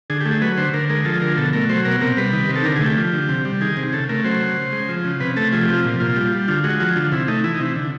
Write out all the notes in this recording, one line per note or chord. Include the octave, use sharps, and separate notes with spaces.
D3 G#4
G4
A3
G#4
F#3 B4
D3 C5
D3 A#4
G#3 A#4
F3 A4
D3 A#4
B2 A4
A3 A#4
F#3 C5
B2 A#4
C3 A#4
G3 B4
D#3
C3
A4
D3 A#4
G#4
A3
G4
F3
D3
C3
G3
D#3 G#4
C3
C#3 A4
A3 A#4
F#3 C5
C#3
C#3
G#3
F3
C#3
C3 B4
A3 A4
F3 G#4
G4
C3
F4
A#2
A#2 F4
G3
G3
D3 F4
G#3 F#4
F3 F#4
D3 F4
C3 E4
A3 D#4
E3 E4
D#4
C3
E4
D3